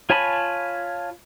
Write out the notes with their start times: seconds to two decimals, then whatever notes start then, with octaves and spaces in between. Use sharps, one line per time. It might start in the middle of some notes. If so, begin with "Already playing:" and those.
0.10 F4 C#5 G#5 A5 B5